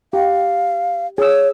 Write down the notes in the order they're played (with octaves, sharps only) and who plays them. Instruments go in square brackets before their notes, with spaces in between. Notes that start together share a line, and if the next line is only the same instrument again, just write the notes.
[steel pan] G4 [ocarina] F5
[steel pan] G#4 E6 [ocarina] C#5